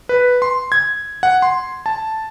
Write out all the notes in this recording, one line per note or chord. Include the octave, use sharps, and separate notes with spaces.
B4
C6
G#6
F#5
C6
A5